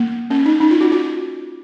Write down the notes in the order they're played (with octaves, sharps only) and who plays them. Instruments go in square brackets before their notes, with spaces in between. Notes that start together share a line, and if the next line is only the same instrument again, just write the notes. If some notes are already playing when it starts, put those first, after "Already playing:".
Already playing: [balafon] A#3
C#4
D#4
D#4
F4
F#4
F#4